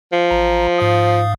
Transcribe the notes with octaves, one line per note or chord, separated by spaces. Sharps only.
F3
A1 A#5
G#2 F5 D#6